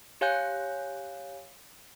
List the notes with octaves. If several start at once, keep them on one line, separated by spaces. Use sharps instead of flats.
G4 C#5 F5 G#5 F#6 G6